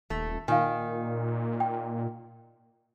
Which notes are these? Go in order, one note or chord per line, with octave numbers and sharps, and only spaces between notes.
D#1 A3
A#2 D#3 F5 G#5
G5